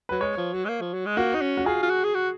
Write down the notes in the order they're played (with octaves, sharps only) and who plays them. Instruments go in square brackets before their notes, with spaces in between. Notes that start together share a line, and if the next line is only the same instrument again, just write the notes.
[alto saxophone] F#3 [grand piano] B4
[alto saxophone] G#3 [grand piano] C#5
[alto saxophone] F3
F#3
G#3
A#3
F3
F#3
G#3
[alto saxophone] A#3 [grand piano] F#4
[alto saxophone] D#4
C#4
[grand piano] F#4
[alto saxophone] F4 [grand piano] G#4
[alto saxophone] F4
F#4
G#4
F#4